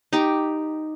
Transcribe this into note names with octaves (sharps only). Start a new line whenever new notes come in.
D#4 G4